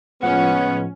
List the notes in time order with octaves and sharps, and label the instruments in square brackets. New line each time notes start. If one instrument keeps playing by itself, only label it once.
[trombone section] C#2 G#3 B3 [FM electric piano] A2 F3 [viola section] C#4 [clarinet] F#5